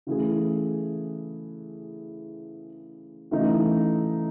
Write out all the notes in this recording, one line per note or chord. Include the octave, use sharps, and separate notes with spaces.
C#3 E3 A3 E4 G#4
C#3 E3 A3 D#4